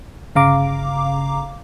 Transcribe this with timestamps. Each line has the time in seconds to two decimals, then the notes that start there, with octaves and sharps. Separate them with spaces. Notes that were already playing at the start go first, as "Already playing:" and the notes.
0.35 G1 C#3 F5 A#5 D6